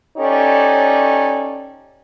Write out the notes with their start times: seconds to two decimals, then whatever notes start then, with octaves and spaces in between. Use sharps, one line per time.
0.18 C#4 D#4 G4 A4 C#5 D5